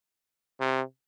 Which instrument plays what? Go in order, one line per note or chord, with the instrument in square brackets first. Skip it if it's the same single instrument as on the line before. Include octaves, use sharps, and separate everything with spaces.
[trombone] C3